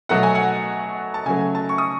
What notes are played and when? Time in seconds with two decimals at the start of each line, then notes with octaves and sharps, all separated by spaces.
0.09 B2 F#3 A3 F#5
0.23 G#5
0.35 F#5
1.14 A5
1.26 C#3 F#3 A3 G#5
1.55 A5
1.69 C#6
1.78 D#6